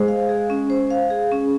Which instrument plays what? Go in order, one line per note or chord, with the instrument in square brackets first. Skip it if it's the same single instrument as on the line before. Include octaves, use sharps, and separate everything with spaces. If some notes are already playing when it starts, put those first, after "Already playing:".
Already playing: [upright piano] G#3 [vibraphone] C5
[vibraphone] F5
G#4
C#4
C5
F5
G#4
C#4